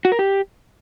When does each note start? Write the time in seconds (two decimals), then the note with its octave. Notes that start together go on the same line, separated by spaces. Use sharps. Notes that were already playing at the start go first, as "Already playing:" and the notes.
0.05 F#4
0.12 A#4
0.19 G4